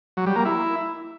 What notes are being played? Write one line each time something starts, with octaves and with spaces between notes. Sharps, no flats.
F#3
G3
A#3
E4